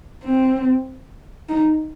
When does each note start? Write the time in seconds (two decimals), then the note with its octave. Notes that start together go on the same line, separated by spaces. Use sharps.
0.24 C4
1.49 D#4